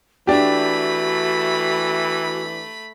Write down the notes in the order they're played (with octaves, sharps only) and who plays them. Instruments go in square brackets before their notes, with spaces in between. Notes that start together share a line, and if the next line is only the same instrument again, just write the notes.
[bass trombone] E3 [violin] A3 B5 [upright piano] D4 G4 [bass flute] F#4